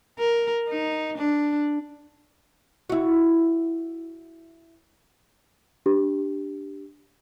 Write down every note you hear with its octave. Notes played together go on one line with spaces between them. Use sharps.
A#4
D#4
D4
E4 F#4
D4 G4